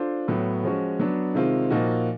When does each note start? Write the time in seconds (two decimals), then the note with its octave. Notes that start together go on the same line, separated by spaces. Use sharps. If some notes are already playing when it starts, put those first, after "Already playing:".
Already playing: D4 F4 A4 C5
0.28 A2 F#3 B3
0.64 F3 G#3 C#4 F#4
0.99 F#3 B3 D4
1.35 C3 D#3 G#3 C4 F4
1.70 A#2 F3 A#3 D#4 F#4